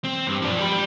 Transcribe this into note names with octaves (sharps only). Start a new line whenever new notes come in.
C4
G2
F3 D4
G4 B5